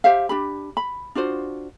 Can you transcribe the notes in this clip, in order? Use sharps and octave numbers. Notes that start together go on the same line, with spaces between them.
G4 C5 E5 F5
D4 G4 B5
B5
D4 F4 F#4 C5